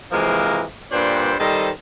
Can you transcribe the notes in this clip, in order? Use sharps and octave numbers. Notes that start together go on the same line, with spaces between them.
C3 E3 F3 G#3 A#3 A#4
G2 A#2 D4 B4 C5 G5
D#3 G3 C4 A4 C5 D#5